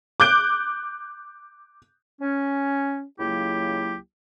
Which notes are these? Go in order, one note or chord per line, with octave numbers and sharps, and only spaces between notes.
D6 F#6 G6 D7
C#4
C#2 F#3 A#3 E4 G4